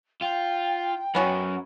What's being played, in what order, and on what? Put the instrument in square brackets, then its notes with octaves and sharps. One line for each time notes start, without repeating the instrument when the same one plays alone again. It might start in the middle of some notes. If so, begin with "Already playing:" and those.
[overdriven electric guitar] F4 [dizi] G5
[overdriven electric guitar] F#2 [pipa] B3 C#4 F#4